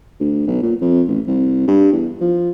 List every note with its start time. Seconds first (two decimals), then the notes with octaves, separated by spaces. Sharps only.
0.20 D2
0.47 B1
0.63 A#2
0.81 F2
1.08 A1
1.27 C2
1.68 G2
1.92 E2
2.21 F3